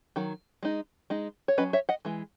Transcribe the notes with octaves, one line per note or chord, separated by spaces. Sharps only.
D#3 F#3
G#3 D#4
G#3 D#4
C#5
F#3 C#4 B4 D#5
C#5 E5
D#5 F#5
E3 G#3